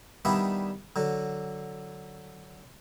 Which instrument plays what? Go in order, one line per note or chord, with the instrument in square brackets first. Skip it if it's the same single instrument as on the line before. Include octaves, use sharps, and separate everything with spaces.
[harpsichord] D#3 G3 B3 D4 E4
D3 F#3